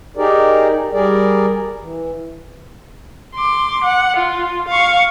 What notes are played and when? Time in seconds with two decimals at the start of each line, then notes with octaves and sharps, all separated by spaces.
0.17 D#4 G4 G#4 A#4 D5
0.93 G3 G#4 A#4 D5
1.80 E3
3.34 C6 D6
3.84 F#5
4.16 F4
4.68 F5 C#6